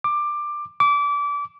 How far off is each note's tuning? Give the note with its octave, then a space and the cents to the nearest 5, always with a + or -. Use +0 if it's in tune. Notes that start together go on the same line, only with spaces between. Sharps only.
D6 +15
D6 -25